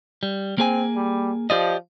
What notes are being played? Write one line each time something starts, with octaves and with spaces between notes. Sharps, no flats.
G3
A#3 C4 G#4 G#5
G3
F3 G4 D5 D#5